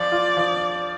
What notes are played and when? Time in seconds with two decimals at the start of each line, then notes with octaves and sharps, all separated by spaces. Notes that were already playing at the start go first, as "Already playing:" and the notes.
Already playing: F3 D5
0.12 F4
0.37 F3